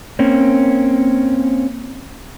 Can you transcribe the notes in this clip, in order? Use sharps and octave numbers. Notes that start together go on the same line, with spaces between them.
A#3 C4 C#4